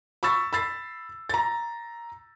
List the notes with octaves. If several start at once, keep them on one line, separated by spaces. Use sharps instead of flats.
B5 C#6 E6 A6
B5 E6 A6 C7
A#5 A6